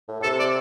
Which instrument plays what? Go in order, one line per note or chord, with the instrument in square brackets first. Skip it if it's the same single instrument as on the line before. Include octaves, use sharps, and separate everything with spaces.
[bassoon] A2
A2
[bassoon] C3 [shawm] A4
[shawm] D5